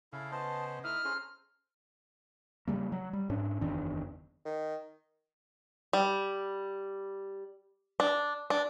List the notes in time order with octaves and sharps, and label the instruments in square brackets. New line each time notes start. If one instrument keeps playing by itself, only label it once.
[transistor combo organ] C#3 [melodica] E4 A4 F5
[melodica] B3 C5 D#5 [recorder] A5
[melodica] A3 D#4 [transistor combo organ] E4 D#5 [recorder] F6
[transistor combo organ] C#4 G#4 C6 [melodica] A4 C5 A#5
[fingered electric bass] C#3 G3 A#3
F#3
G3
G#2 C#4 D4
F#1 E2 D#3 D4
[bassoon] D#3
[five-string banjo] G3
D4
D4